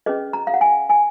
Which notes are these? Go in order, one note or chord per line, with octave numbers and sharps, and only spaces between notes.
C#4 G#4 B4 D#5
A#5
F5
F#5
G#5
G#5